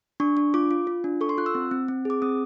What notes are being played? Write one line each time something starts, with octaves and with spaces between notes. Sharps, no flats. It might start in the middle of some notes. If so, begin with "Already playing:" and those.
D4 C#6
D4
F4 D6
F4
F4
D4
A4 C#6
C6
F4 F#6
E6
C4
C4
C4
G#4 D6
C4 D#6